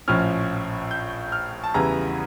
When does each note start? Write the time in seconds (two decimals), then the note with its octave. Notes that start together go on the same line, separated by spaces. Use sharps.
0.08 A#1 A2 F3 C#4 F6
0.91 G6
1.32 F6
1.64 A5
1.74 E2 C#3 E3 G3 A#5